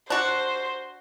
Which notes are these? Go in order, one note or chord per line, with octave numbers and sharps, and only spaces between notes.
D4 F#4 C5